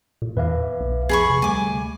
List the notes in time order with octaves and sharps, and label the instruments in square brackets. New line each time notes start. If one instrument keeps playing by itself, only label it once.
[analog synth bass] A#2
[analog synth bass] E2 [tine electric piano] B4 E5 F5
[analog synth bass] B1
[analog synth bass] F2 [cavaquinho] G#4 B5 C#6
[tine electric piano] C3
[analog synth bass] D2 [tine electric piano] G3 A3 [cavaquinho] G#5 D6